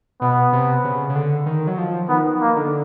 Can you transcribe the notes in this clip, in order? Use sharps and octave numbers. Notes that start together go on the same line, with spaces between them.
B2 B3
C3
C#3
C#3
D3
D#3
F#3
F3
D#3 B3
A#3
D3